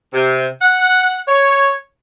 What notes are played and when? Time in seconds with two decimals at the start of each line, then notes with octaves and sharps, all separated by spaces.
0.13 C3
0.62 F#5
1.28 C#5